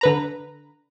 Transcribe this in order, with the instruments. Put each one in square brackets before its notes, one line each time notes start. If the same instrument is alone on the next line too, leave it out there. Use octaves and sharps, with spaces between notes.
[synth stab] D3 B4 A#5